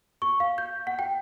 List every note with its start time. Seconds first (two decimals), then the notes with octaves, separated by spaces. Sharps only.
0.22 C#6
0.40 F5
0.58 G6
0.87 F#5
0.99 G5